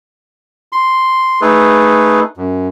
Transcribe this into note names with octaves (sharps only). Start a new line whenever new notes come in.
C6
A3 D#4 G#4 A4 B4
F#2